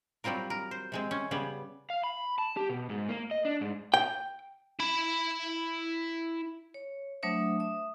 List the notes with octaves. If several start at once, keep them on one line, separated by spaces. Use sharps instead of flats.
F#3 G3 C4 F4 A#4
A#4
C5
C3 G#3 C4
C#4
C#3 G3 B3
F5
B5
A5
G4
B2
G#2
A#3
D#5
D4
G#2
G5
E4 B5
C#5
F#3 A3 D4 C5 E5 D#6
E5 D#6